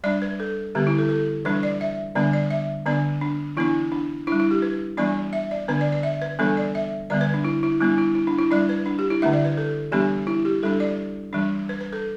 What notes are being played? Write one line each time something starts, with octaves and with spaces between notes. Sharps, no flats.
G3 D4 D5
B4
A4
D3 G3 B3 G4
E4
A4
A4
E3 G3 D4 B4
D5
E5
D3 G3 B3 D4 D5
D5
E5
D3 B3 D4 D5
D4
E3 B3 D4 E4
D4
G3 D4 E4
E4
G4
B4
E3 G3 B3 D4 D5
E5
D5
D3 B3 D4 B4
D5
D5
E5
B4
E3 G3 B3 D4 A4
D5
E5
D3 G3 B3 D5
B4
D4
E4
E4
G3 B3 D4 E4
E4
E4
D4
E4
G3 D4 D5
B4
D4
G4
E4
D3 A3 D4 E5
D5
B4
A4
E3 G3 B3 D4 G4
E4
G4
G3 D4 A4
D5
E3 G3 D4
B4
B4
A4